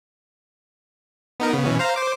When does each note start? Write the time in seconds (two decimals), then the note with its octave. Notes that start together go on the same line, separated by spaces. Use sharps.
1.40 B3 D#4 A#4
1.53 C#3 B3
1.65 B2 E3 C#4
1.79 C5 F5 A#5
1.96 C5 D6